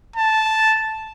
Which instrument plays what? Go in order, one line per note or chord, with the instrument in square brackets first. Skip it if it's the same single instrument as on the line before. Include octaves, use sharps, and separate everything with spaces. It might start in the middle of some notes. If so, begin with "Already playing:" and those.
[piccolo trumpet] A5